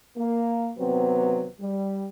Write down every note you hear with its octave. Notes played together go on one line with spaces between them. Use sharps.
A#3
D#2 C3 F#3 B3 C4 B4
G3